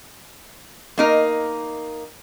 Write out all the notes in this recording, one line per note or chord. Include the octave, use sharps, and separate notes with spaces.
A#3 D#4 A#4